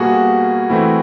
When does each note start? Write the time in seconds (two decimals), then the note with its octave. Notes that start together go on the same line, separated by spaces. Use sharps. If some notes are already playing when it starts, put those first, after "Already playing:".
Already playing: B2 G3 A#3 F#4 G#4
0.70 E3 A3 C4 E4